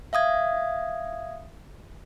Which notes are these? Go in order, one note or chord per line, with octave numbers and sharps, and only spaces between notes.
E5 F5 D#6 G#6